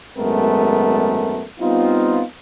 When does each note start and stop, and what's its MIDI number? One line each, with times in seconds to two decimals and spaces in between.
0.18 1.45 32
0.18 1.45 42
0.18 1.45 56
0.18 1.45 57
0.18 1.45 59
0.18 1.45 70
1.60 2.23 55
1.60 2.23 59
1.60 2.23 60
1.60 2.23 63
1.60 2.23 65